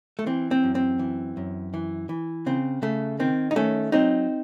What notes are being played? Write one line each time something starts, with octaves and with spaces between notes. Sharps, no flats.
A3
E3 C4
C4
F#2
C4
E3
F#2
E3
E3
C#3 C4
C#3 A3
D#3 C4
D#4
D#3 A3 C#4
F#3 C4 D#4